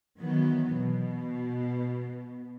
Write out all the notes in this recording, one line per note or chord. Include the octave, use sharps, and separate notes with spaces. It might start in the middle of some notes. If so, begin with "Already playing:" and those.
D#3 E3 F#3 B3
B2